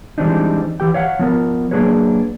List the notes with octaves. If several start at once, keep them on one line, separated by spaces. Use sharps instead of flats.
E3 G3 G#3 C4 D4 D#4
E3 G4 G5
C#5 F5 F#5
F3 B3 A#4
F#3 A#3 D4 G#4 B4 C#5